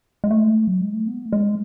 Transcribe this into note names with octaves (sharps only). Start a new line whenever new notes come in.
G#3
A3
F#3
G#3
A3
B3
A3
G#3